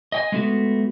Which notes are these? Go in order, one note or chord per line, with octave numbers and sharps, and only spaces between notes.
D#5 G5 G#5
G#3 A3 B3 D#4 F#4